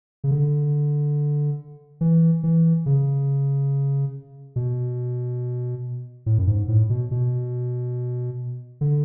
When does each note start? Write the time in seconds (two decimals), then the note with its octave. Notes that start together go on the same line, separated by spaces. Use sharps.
0.24 C#3
0.31 D3
2.01 E3
2.43 E3
2.86 C#3
4.56 B2
6.26 A2
6.38 F#2
6.47 G#2
6.68 A2
6.90 B2
7.11 B2
8.81 D3